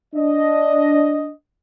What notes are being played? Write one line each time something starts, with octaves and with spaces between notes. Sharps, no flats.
D4 D#5